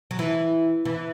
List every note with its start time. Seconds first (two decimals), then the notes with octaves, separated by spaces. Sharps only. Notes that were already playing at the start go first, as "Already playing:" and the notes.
0.11 F#3
0.19 E3
0.85 E3